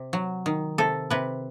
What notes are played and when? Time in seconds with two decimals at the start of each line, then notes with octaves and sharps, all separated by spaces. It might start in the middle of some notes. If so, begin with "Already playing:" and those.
Already playing: C3
0.13 F#3
0.46 D#3
0.78 C3 A4
1.10 C3 B4